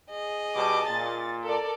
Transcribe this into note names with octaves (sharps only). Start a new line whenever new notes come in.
G#4 D#5
B2 G3 A5 D6
A#2 A6
A4 A#4 D5